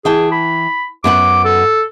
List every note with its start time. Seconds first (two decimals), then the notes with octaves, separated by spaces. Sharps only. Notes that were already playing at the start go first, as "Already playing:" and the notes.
0.05 E3 G#4 G5 A5
0.32 B5
1.04 F#2 B3 F#5 D6
1.44 A4